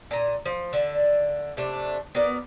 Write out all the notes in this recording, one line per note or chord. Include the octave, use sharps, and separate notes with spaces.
A#2 A#5
F3
D3 E5
C3 A3 D4
B3 F#4 A#4 D5